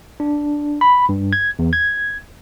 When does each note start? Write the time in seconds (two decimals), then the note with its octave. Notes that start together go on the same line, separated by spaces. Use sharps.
0.20 D4
0.81 B5
1.09 G2
1.33 G#6
1.59 E2
1.73 G#6